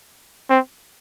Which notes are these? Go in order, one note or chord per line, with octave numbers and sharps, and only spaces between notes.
C4